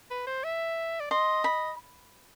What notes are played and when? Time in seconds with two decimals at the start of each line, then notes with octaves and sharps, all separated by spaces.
0.11 B4
0.27 C5
0.44 E5
1.00 D5
1.11 D#5 C6
1.44 B5